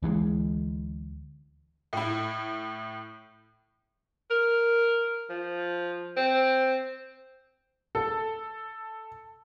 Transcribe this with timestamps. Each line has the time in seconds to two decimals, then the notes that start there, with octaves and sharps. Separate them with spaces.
0.03 D2 E3 G3 G#3
1.93 A2 E4
4.30 A#4
5.30 F3
6.17 C4
7.95 A4